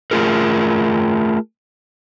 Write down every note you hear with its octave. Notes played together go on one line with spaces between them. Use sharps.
A3 F4 G#4 A#4